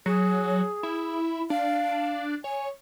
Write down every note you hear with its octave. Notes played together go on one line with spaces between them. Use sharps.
F#3 G#4
E4
D4 F5
C#5 G#5